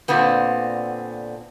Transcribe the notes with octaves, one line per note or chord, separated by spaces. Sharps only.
A#2 D3 B3 C4